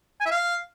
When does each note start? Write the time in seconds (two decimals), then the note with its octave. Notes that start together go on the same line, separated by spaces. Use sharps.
0.21 G#5
0.26 E5
0.31 F5